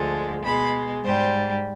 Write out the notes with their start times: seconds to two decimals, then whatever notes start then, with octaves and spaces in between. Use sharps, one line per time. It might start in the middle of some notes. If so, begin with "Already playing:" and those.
Already playing: D2 D3 F3 G#3
0.44 B2 G#3 B5
1.04 G#2 G3 C5